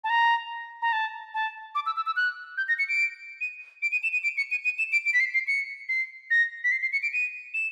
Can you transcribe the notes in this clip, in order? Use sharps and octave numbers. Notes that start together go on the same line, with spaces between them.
A5
A#5
A#5
A5
A5
D6
E6
E6
E6
F#6
G6
A#6
C#7
D7
D#7
D7
D#7
E7
D#7
D7
C#7
D#7
D#7
E7
D7
D7
B6
C7
C7
C#7
C7
A#6
B6
C7
C7
C#7
D7
D#7
E7